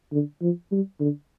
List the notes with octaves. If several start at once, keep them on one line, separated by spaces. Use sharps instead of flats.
D3
F3
G3
D3